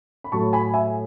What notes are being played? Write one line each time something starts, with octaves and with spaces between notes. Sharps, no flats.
B5
A2 F#3 A5 C#6
G#5 B5
E5 G#5